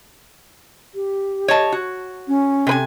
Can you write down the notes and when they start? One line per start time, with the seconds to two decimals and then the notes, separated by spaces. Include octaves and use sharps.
0.95 G4
1.48 C#5 D#5 A5
1.72 F#4
2.28 C#4
2.67 C3 B4 G#5